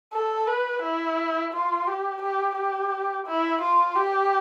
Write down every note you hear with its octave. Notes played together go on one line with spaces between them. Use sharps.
A4
B4
E4
F4
G4
G4
G4
E4
F4
G4